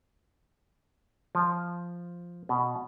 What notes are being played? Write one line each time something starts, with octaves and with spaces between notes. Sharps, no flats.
F3
B2